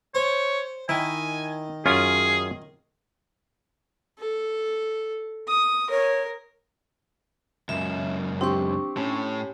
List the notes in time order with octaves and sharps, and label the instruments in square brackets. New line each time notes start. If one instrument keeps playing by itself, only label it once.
[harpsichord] C5 [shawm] C#5
[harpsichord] D#3 [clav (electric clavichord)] E4 [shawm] G#5
[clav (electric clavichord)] F#2 C#4 F4 [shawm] G#4
[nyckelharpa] A4
D#6
[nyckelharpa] A#4 [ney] C#5
[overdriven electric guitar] C#2 F#2 [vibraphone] E5
[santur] C4 G4 [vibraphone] D4 C#6
[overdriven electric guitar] A2 [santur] C#4